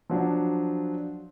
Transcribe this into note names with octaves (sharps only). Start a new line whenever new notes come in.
F3 F#3 D4